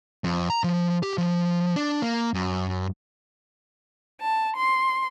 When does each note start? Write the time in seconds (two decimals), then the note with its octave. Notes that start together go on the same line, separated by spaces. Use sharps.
0.24 F2
0.50 A#5
0.64 F3
1.03 G4
1.18 F3
1.76 D4
2.02 A#3
2.34 F#2
4.21 A5
4.56 C6